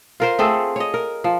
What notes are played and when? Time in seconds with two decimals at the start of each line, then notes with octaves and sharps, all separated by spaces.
0.20 F4 A#4 C5
0.39 A3 C4 G#4 A4
0.76 C#5 D#5
0.94 A#4
1.24 F3